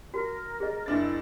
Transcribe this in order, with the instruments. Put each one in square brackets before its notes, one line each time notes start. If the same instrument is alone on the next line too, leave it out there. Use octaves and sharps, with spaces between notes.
[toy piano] F#4 [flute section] A#4
[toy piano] G#4 D#5
[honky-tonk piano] F#1 D4 A6 [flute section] E4 [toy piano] B4